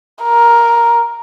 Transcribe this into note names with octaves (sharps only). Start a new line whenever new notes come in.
A#4